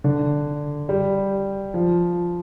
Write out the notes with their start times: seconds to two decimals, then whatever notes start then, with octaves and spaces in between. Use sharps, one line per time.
0.04 D3
0.89 G3
1.74 F3